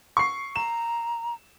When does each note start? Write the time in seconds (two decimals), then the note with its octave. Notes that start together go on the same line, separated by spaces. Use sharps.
0.17 C#6 C7
0.56 A#5 E7